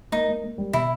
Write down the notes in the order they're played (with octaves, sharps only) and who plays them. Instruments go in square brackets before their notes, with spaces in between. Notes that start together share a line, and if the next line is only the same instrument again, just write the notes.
[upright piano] A#3 [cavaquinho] D#4
[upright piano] A#3
A#3
G3
[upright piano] B2 [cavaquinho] E4